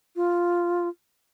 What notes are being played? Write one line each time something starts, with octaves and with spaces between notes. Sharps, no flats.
F4